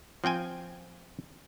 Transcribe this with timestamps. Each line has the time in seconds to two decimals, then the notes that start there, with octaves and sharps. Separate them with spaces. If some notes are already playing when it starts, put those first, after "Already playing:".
0.24 F3 C4 G5 G#5